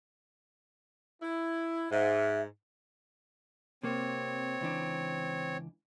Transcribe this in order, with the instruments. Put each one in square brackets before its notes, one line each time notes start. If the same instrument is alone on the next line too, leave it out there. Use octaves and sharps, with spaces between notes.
[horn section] E4
[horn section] G#2 [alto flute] E5
[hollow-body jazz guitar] C3 A#3 [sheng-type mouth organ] C4 C#5
[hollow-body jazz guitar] C#2 E3 D4